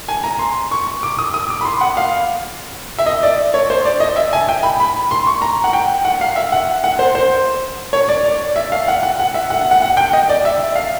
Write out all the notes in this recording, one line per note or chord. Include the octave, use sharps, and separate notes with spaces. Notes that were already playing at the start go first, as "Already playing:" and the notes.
G#5
A#5
C6
C#6
D6
D#6
D#6
D6
B5
C6
F#5
F5
E5
D#5
D5
C#5
C5
D5
D#5
E5
G#5
G5
B5
B5
C6
C#6
A#5
F#5
G5
F#5
F5
E5
F#5
F#5
C5
C5
C#5
D5
D5
E5
F5
F#5
F#5
F#5
E5
F#5
F#5
F#5
F#5
G5
D#5
D5
E5
F5